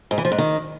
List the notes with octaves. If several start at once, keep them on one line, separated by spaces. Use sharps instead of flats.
G#2
E3
F3
G#2
D#3